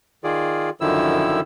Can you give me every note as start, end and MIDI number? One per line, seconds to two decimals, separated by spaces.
0.24 0.70 51
0.24 0.70 65
0.24 0.70 68
0.24 0.70 74
0.81 1.41 42
0.81 1.41 50
0.81 1.41 51
0.81 1.41 53
0.81 1.41 64
0.81 1.41 88